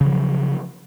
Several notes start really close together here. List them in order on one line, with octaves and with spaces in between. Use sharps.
C#3 F3 F#3